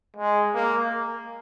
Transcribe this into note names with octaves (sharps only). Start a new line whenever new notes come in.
G#3
A#3